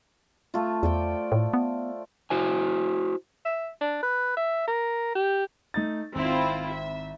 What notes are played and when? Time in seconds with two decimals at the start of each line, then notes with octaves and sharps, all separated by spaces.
0.54 A3 F4
0.83 E2 C5 D5 G5
1.32 A2
1.54 B3
2.30 E4 F#4 C5 G#5
3.45 E5
3.81 D4
4.02 B4
4.37 E5
4.67 A#4
5.15 G4
5.74 A3 D#4 A6
6.15 G#1 C4 E4 F4
6.71 E5